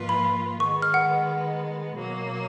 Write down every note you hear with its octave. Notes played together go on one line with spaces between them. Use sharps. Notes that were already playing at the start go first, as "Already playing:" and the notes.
Already playing: G#2 F3 A#3 F4 B4
B5
D#3 G#3 B3 C#6
F6
F#5
B2 F#3 A#3